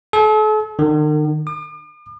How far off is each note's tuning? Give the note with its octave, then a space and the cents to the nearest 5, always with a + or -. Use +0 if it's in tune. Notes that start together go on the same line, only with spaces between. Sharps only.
A4 -40
D#3 -45
D6 +45